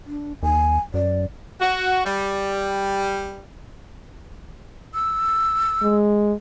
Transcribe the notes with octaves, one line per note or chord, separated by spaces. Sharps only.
D4
D#2 G#5
F#2 D5
F#4
G3
E6
G#3